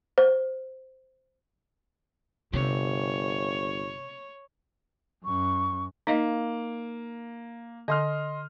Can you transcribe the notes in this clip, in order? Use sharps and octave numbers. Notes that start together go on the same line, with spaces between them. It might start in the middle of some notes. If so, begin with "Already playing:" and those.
C5
G1 C3 C#5
F#2 C#6
A#3 D#4 D#5 F5
D3 D#5 C6 F6